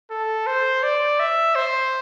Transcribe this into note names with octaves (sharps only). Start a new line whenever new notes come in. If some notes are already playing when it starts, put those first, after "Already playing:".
A4
C5
D5
E5
C5